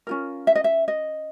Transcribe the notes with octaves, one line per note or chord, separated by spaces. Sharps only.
C#4 F4 A#4
E5
D#5
E5
D#5